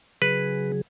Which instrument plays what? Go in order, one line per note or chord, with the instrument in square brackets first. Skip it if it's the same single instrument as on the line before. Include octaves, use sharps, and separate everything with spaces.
[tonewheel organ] C#3 F#3 G#4 [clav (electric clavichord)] B4